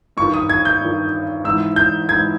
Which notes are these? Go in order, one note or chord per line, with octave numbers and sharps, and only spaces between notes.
G2 D#3 C#6
D#6
G#6
G6
G2 D#3
G#2 E3 E6
G6
G#2 E3 G#6